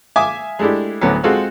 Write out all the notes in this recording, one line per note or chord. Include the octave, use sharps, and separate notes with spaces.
E5 F5 G#5 D6 D#6
G#3 A3 D4 E4 G4
D2 A2 D3 F#3 B3 C#4
G#3 C4 F4 F#4 A4